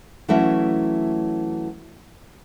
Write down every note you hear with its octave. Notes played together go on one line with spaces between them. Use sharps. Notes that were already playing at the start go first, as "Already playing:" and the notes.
E3 F#3 A3 C#4 E4 E5